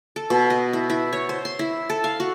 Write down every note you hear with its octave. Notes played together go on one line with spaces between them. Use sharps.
A4
B2
D#5
E4
E4
C#5
C5
C6
E4
A4
F5
F#4